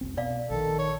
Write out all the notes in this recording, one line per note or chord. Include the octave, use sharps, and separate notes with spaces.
F1 C2 C4
B2 D5 F5
A#1 D#3 A4
C#5